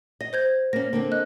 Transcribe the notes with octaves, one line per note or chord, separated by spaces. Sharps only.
D#5 A#6
C5 G6 G#6
A#3 C#4 A#6
D3 A#3 C4
D#5 F#6